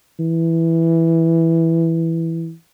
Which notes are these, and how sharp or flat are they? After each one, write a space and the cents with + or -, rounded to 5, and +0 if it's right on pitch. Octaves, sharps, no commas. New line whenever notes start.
E3 +0